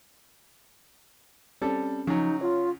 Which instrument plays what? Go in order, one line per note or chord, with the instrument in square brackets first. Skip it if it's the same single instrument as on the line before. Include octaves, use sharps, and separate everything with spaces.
[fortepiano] G3 A4 [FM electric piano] C4 C#4
[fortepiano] C#3 F#3 [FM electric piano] F3 [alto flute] D#4
[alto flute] F4 [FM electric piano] C#5 F5